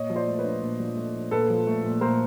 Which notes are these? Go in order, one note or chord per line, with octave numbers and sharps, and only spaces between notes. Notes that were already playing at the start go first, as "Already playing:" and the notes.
Already playing: A#2 C#5 D#5
F3
C5 D5
A3
B4 C#5
D4
A#2
F3
A3
D4
A#2 A4 B4
F3
A3
A#2
A#2 A#4 C5